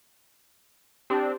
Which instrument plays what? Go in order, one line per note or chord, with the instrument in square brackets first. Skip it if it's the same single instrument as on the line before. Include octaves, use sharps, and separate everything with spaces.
[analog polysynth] C4 D4 [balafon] G4